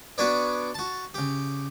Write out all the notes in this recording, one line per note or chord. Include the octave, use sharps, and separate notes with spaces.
B3 D4 F#4 B4 C#5 D5
F#4 A5
C#3 G4